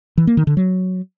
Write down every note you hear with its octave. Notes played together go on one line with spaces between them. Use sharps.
E3
A#3
D#3
D3
F#3